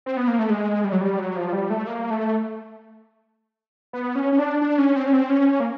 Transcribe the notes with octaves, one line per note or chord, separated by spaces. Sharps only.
C4
B3
A#3
A3
G#3
G3
F#3
G3
F#3
F3
G3
A3
A#3
A3
B3
C#4
C#4
D4
D4
C#4
C4
C#4
C4
C#4
A#3